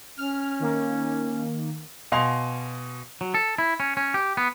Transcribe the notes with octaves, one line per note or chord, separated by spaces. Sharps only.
C#4 F6
D#3 A#3
B2 D#5 F5 G#5 C6 F7
F#3
A4
E4
C#4
C#4
G4
B3